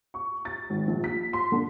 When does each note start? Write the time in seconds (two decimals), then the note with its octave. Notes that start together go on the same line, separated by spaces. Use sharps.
0.14 C#6
0.45 A6
0.70 G#1
0.88 A#1
1.04 B6
1.33 C6
1.52 D3